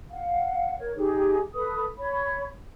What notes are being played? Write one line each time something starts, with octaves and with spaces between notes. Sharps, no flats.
F5 F#5
A#4 C#5
D#4 G4 G#4
A4 B4 D#6
C#5 B5